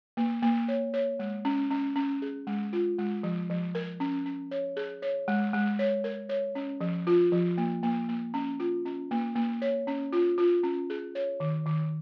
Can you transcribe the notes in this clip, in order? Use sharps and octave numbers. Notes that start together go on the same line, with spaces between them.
A#3
A#3
C#5
C#5
G#3
C#4
C#4
C#4
G#4
G#3
F4
G#3
F3
F3
A#4
C#4
C#4
C#5
G#4
C#5
G#3
G#3
C#5
A#4
C#5
C#4
F3
F4
F3
A#3
A#3
A#3
C#4
F4
C#4
A#3
A#3
C#5
C#4
F4
F4
C#4
G#4
C#5
D#3
D#3